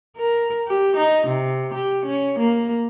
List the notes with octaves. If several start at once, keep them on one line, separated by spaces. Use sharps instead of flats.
A#4
G4
D#4
C3
G4
C#4
A#3